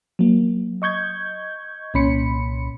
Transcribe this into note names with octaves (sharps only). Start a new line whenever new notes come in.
F#3 A#3
D#5 C#6 G6 G#6
C2 A#2 C#4 B5 C6 C#7